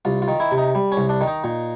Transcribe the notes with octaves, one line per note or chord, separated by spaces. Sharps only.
C2 F4
F4
D#3
E4
C3
D#4
G3
C#4
C2
D4
D#3
D#4
A#2